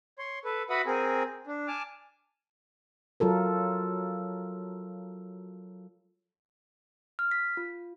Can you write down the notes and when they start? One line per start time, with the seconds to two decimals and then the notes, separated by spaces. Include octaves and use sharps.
0.19 C#5 C6
0.45 A4 B4
0.70 F#4 B4 E5 F#5 B5 D#6
0.86 C4 G#4 A#4 G#5
1.47 D4
1.68 G#5 A5 D6 F6
3.20 F#3 F4 A4 A#4
7.19 F6
7.31 B6
7.57 F4